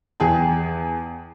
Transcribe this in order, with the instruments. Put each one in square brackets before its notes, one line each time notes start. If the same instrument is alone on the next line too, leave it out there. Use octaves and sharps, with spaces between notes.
[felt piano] E2 G#4 G5 A5